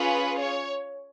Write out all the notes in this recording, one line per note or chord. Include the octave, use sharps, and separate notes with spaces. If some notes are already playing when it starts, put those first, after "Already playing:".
Already playing: C#4 F4 G#4 B4
C#5